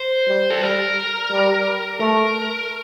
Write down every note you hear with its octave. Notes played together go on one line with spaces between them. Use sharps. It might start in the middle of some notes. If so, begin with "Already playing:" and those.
Already playing: C5
G3
A4
G3 A#4
G3
A3 A#4